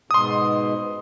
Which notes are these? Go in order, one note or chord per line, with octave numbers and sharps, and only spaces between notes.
G#2 B2 C6 D#6